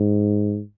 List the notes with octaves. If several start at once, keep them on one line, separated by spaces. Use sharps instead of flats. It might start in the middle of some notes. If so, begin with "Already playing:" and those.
Already playing: G#2